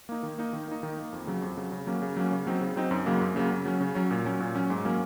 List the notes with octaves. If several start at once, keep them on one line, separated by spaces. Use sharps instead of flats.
A#3 D#4
D#3
A#3 D#4
D#3
A#3 D#4
D#3
A#3 D#4
F2
C#3 F#3
F2
C#3 F#3
C#3
F#3 A#3 C#4
C#3
F#3 A#3 C#4
C#3
F#3 C4 D#4
C#3
F#3 C4 D#4
F#2
C#3 F#3 A#3
F#2
C#3 F#3 A#3
C#3
F#3 C#4
C#3
F#3 C#4
A#2
F#3 C#4
A#2
F#3 C#4
G#2
F#3 A#3 C#4